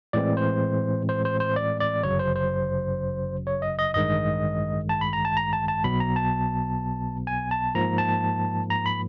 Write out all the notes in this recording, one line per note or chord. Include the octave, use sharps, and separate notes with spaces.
A2 E3 G#3 C4 D5
C5
C5
C5
C5
D5
D5
G1 F#2 C#3 F#3 C#5
C5
C5
C#5
D#5
D#5
A1 G2 D#3 G#3 D#5
A5
B5
A#5
A5
A#5
A5
A5
B1 B2 F#3 B3 B5
A#5
A5
G#5
A5
G#2 F3 A#3 A#5
A5
A#5
B5